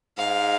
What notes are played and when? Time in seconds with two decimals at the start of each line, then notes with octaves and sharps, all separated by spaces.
0.17 G#2 F5